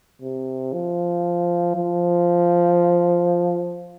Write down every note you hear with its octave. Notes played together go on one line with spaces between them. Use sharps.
C3
F3
F3